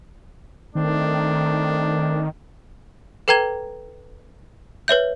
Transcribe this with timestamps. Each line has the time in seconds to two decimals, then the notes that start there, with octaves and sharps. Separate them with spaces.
0.75 D#3 A3 C4 D4
3.28 A4 B4 G5 A#5 G#6 G7
4.88 B4 C#5 E5 G6